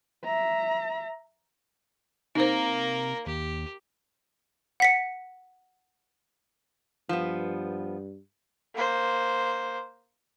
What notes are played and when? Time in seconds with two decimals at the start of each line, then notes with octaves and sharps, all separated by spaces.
0.25 E5 A#5
2.35 C3 A#3 D#4 A#4 C5
3.27 D#2 G4
4.80 F#5 B6 C#7
7.09 G2 F3 B3
8.75 A#3 C5